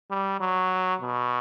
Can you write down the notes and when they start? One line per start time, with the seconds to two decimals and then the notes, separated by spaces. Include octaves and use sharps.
0.10 G3
0.40 F#3
1.01 B2